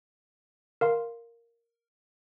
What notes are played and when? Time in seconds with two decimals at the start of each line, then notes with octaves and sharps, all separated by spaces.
0.81 A#4 F5 C6